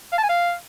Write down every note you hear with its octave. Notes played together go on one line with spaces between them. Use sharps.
F5
A5
G#5
F5